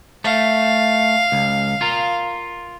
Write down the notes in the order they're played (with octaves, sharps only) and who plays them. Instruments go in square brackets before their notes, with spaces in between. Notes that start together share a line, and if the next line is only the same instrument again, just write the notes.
[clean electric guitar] A3 [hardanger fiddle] F5
[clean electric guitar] C#2
F4 A#4